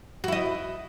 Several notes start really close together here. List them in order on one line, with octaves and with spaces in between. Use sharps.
F#4 E4 D#5